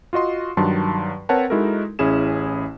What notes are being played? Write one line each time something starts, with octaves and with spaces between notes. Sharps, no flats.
F4 F#4 D#5 C6
G2 D#3 F#3 A5 C6
C4 A#4 B4 C#5 F#5 A5
G#3 D#4 E4 F#4 A4 A#4
A1 C#4 E4 G#4 E7